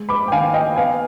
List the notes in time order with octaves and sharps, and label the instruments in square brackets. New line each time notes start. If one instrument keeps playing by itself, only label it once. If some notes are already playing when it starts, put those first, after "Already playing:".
Already playing: [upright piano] G#3
B5 D6
G5
D#3 F5 G#5
D#5 G5
B3 F5 G#5